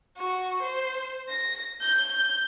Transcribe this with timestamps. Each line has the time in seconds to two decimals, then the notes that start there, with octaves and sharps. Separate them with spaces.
0.17 F#4
0.63 C5
1.29 A#6
1.81 G6